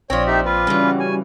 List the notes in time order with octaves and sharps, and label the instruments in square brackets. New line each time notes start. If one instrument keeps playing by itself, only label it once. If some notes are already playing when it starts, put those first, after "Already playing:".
[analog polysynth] A#1 D5 [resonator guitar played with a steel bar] F3 C4 [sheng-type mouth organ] C#5
[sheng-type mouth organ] D#4 G4 E5
F4 B4
[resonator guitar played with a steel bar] C#3 E3 [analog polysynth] G3 C#4 F#4
[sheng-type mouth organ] G#5